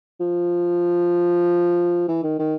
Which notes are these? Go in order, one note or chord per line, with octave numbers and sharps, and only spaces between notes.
F3
E3
D#3
D#3